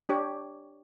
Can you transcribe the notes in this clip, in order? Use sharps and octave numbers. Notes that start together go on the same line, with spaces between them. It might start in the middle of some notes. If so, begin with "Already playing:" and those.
D4 G4 C#5